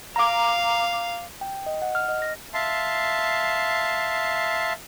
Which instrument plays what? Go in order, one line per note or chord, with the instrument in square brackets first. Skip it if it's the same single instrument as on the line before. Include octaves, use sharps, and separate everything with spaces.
[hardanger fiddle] F5 [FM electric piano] A#5 D6
[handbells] G5
D#5
F#5
F6
D#5
A#6
[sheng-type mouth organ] E5 F5 A5 C6